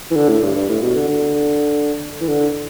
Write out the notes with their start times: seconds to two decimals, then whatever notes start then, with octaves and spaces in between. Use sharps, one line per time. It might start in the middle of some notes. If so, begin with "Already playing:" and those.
0.11 E3
0.16 D3
0.29 A2
0.43 G2
0.55 G2
0.69 A2
0.82 B2
0.96 D3
1.08 D3
2.21 E3
2.28 D3